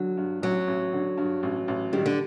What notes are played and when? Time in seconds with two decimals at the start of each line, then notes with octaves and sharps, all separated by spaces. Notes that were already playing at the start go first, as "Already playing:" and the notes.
Already playing: D3 F#3
0.17 G2
0.42 A1 F#3
0.68 A1
0.93 D3
1.18 G2
1.43 A1
1.68 A1
1.93 D#3 G3
2.06 D3